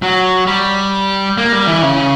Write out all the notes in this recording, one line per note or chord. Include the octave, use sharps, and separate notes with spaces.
F#3
G3
A#3
G3
E3
C#3